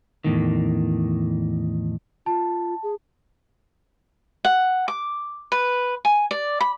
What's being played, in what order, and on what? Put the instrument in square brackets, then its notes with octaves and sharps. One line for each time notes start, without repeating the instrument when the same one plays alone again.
[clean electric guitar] E2 A2 D#3
[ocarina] F4 [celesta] A5
[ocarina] G#4
[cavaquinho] F#5
D6
B4
G#5
D5
B5